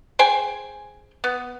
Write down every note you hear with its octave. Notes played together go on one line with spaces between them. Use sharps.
G#4 C5 G5 G#5
B3